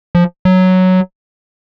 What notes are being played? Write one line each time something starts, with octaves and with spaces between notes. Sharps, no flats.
F3
F#3